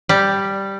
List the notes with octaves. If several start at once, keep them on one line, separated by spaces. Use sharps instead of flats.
G3